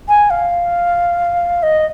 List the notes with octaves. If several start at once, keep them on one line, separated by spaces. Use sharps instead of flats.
G#5
F5
D#5